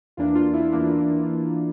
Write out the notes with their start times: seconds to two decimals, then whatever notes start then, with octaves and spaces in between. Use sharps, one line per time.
0.17 E2 E3 A#3 D4 F4
0.35 F4
0.53 E4
0.72 E2 E3 A#3 D4